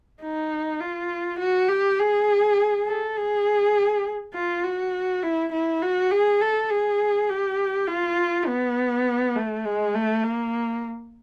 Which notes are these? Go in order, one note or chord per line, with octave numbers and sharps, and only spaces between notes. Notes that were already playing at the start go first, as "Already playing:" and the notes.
D#4
F4
F#4
G4
G#4
A4
G#4
F4
F#4
E4
E4
F#4
G#4
A4
G#4
G4
F4
B3
A3
G#3
A3
A#3